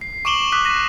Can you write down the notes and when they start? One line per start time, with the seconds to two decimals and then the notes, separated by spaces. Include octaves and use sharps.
0.01 C7
0.25 C#6 D6 D7 E7 F#7 G7
0.52 D6 D#6 F#6 B6
0.65 A#6 D#7